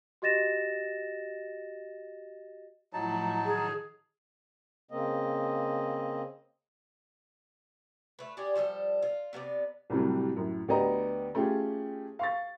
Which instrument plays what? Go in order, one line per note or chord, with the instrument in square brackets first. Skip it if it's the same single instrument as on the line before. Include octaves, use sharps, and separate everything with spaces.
[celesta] F#4 G4 D#5 A6 A#6 E7
[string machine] A2 F3 E4 [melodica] F#3 D#4 A5
[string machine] D#3 F6 [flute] G#4
[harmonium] C#3 A#3 C4 D#5
[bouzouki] A3 B4
G4 G#4 D5
F3 G3 A4 C5
F4
C3 B3 A4 D5
[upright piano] C2 A2 C3 F#3 G3
F#2 A2
D2 B3 G4 D5 D#5 A#5
A3 C#4 F4 G4 G#4
F5 C#6 A6